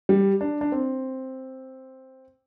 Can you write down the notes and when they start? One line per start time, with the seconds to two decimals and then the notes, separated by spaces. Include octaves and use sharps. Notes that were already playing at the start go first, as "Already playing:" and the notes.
0.09 G3
0.41 D4
0.61 D4
0.72 C4